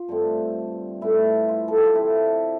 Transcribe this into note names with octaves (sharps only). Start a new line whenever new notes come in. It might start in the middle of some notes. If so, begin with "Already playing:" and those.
Already playing: F4
G2 D3 A3 C4
A2 G3 B3 D4 E4
F4
A4
G4
F4
D3 F3 C4 E4